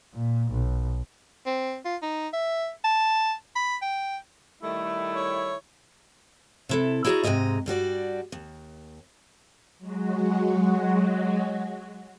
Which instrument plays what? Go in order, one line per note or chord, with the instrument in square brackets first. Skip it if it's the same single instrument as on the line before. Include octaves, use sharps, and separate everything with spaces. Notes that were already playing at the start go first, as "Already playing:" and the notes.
[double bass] A#2
B1
[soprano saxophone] C4
F4
D#4
E5
A5
B5
G5
[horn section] D#3 G3 A3 [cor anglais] E4
[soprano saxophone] C#5
[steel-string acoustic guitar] C3 E4 A4
E4 F#4 G#4 C5 D5 A#5
G#2 C3 G#3 D#5 A#5
G2 G3 F#4 D5
D#2
[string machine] F#3 G#3 F#4